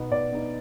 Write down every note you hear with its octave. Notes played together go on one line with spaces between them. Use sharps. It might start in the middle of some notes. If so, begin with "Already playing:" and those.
Already playing: B2 B3 D#4
B2 D5
B3 D#4